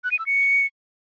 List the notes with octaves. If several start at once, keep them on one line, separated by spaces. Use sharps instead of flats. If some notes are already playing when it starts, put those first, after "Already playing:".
F#6
D#7
E6
C#7